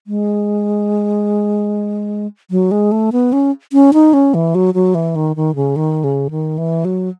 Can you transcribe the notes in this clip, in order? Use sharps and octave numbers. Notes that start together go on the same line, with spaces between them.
G#3
F#3
G#3
A3
B3
C#4
C#4
D#4
C#4
E3
F#3
F#3
E3
D#3
D#3
C#3
D#3
C#3
D#3
E3
F#3